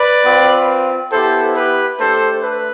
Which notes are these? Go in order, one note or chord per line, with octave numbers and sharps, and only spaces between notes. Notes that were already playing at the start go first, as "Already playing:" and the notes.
Already playing: B4 D5
C4 F4
B3 E4 G4 A4 C5
G4 B4
A3 D4 G4 A4 C5
B4